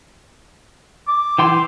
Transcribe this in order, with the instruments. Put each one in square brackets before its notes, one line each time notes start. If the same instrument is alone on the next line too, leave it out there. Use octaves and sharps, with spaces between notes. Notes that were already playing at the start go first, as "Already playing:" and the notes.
[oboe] D6
[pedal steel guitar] E3 G5 C6